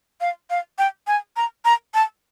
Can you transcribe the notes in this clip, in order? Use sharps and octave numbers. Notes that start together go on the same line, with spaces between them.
F5
F5
G5
G#5
A#5
A#5
A5